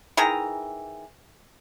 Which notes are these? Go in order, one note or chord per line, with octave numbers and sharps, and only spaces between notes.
D#3 E3 G#4 A#5